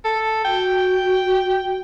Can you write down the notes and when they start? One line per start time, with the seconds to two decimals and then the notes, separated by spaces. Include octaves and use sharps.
0.05 A4
0.45 F#4 G5